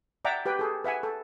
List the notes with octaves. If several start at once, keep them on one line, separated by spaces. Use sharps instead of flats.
D5 E5 F#5 G5 A#5 D6
G4 B4 G5
G#4 A4
B4 E5 F#5 G#5
A4